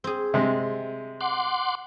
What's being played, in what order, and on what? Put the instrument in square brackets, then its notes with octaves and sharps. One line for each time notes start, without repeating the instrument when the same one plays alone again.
[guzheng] C4 G#4
[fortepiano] C3 G#3
[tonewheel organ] F#5 C6 D6